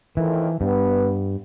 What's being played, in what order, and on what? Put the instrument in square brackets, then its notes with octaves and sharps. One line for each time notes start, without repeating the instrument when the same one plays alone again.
[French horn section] F2 A2 D#3 [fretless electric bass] E3
[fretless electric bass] G2 [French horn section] B3